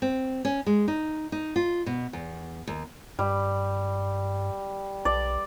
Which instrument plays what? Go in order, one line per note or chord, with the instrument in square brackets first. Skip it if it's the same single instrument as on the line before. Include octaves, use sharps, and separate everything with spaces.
[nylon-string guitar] C4
C#4
G#3
D#4
D#4
F4
B2
E2
D#2
[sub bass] G2 [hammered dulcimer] G3
[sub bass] B1 [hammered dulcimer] D5